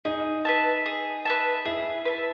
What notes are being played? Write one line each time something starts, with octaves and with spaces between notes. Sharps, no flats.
D#4 G#4
B4 E5 A5
G#4
B4 E5 A5
E4 G#4
B4 E5 A5